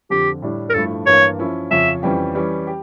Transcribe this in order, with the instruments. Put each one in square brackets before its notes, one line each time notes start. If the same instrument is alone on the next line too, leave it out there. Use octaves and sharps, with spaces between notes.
[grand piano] F2 D3 F3 [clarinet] G4
[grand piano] A2 G3 D4
[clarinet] A#4
[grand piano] G2 F3 A3 E4 [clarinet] A4
[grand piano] G2 E3 A#3 [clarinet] C#5
[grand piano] F3 C#4 E4
[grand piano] F2 C#3 F3 C#4 [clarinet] E5
[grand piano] F2 E3 G3 C#4 G4
E3 G3 C#4
G4